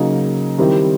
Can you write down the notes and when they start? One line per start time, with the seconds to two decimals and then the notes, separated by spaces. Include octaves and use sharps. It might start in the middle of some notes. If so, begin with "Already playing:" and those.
Already playing: C#3 F#3 A#3 D#4 G#4
0.58 D#3 G3 C4 E4 G4